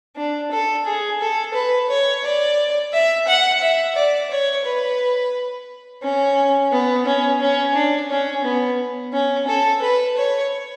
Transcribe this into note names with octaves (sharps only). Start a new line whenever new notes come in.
D4
A4
G#4
A4
B4
C#5
D5
E5
F#5
E5
D5
C#5
B4
C#4
B3
C#4
C#4
D4
C#4
B3
C#4
A4
B4
C#5